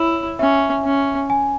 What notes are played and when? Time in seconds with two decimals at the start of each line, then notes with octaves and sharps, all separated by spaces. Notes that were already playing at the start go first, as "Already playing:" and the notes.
Already playing: E4 C#5
0.39 C#4 E5
0.85 C#4
1.30 G#5